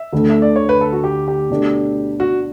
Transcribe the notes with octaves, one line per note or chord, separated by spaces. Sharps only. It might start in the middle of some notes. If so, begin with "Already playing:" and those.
Already playing: E5
D2 D3 A3
E5
D5
C#5
B4
A4
F#4
G4
G4
B2 A3 D4
F#4